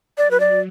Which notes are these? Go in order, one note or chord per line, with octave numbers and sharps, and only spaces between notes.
F#3 D5
B4
D5